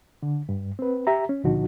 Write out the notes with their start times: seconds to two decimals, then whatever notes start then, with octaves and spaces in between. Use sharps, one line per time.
0.23 D3
0.49 G2
0.79 C4 B4
1.07 G4 E5 A#5
1.29 C#4
1.44 C#2 A#2 D3 F3 D#4 F#4